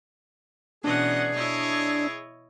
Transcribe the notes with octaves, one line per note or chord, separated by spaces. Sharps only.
B2 E3 C#4 D4 G#4 D#5 F#5
E4 C#5 D#5